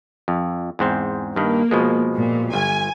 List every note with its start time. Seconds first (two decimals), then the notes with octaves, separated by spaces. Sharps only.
0.28 F2
0.79 E2 G#2 C4
1.36 G2 D#3 A#3
1.71 B2 F3 G#3
2.15 A#2
2.54 G1 G#5